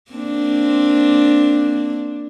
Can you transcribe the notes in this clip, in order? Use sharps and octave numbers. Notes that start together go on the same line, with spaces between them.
A#3 C4 D4